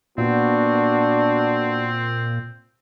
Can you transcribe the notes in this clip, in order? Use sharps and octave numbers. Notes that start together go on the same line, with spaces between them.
A#2 B3 C4 D4 F#4